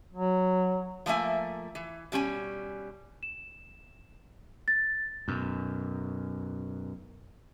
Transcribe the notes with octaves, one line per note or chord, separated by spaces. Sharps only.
F#3
F3 A3 A#3 E5 G#5
E3
B2 G3 C#4 G#5
E7
A6
F#2 B2